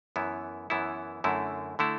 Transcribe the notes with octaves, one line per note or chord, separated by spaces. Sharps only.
F#2 E3 B3 E4
F#2 E3 B3 E4
F#2 D3 A3 E4
D3 A3 E4